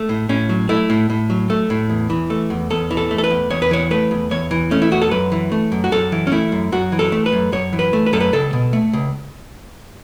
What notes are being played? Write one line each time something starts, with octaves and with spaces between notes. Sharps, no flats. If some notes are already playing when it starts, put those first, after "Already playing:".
Already playing: A3
A2
A2 C#4
F#3
A3 E4
A2
A2
F#3
A3
A2
E2
E3
A3
E2
E2 A4
E3
A4
A3
A4
B4
E2
E2 C#5
B4
E3 C#5
A3 B4
E2
E2 C#5
E3
A3 C#4
E4
E2 F#4
A4
F#2 B4
E3
A3
F#2
F#4
F#2 A4
E3
C#4
A3 E4
F#2
F#2 F#4
E3
A4
A3
B4
F#2
F#2 C#5
E3
B4
A3
B4
F#2 A4
B4
C#2 A4
B2
A3
C#2